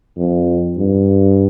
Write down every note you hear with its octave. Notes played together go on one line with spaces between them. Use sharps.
F2
G2